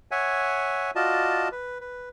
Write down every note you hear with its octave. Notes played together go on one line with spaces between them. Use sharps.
C#5 E5 F#5 G#5
F4 F#4 D5 D#5 A5
B4
B4